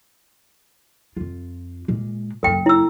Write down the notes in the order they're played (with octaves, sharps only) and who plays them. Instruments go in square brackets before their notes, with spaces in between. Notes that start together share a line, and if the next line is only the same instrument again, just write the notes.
[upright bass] F2 F4
A#2 G#3
[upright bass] F#1 F#2 [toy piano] A4 G5
[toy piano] E4 E6